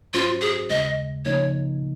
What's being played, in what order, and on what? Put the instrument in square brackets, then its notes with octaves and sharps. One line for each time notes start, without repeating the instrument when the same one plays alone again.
[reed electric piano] G#2 F#3 C#4 F#4 C5 [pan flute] F4
[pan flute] G#4
[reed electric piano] D#2 C#3 G#3 [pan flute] D#5
[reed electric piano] C#2 C#3 F3 A#3 D#4 [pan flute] C#5